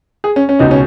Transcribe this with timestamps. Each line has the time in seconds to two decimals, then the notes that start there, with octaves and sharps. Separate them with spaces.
0.24 G#4
0.36 C#4
0.49 C#4
0.59 C#2 B2 D#4
0.71 C#4